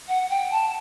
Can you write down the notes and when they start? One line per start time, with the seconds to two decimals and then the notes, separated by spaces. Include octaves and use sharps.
0.08 F#5
0.30 G5
0.52 A5